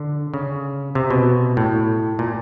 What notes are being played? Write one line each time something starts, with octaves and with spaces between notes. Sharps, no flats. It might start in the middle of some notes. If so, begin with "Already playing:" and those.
Already playing: D3
C#3
C3
B2
A2
A#2